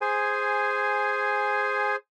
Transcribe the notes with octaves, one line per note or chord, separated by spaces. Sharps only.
G#4 C5 G#5